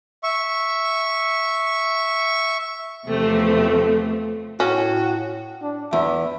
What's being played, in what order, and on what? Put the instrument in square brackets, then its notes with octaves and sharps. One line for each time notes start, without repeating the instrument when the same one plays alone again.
[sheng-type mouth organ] E5 C#6
[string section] E2 C3 F3 A3 C4
[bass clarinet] A2 [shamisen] C#4 [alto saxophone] F#4
[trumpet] D4
[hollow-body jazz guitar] E2 [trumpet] E5